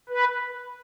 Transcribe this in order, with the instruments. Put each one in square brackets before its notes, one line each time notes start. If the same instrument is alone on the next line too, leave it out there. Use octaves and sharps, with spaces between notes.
[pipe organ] B4